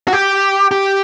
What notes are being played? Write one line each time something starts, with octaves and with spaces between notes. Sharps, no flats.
F#4
G4
G4